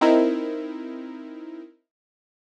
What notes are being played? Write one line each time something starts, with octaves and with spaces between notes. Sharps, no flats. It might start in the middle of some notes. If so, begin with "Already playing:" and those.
C4 D#4 E4 A#4